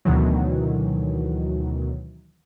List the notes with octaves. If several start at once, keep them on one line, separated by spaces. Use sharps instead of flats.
D2 B2 D#3 E3 F#3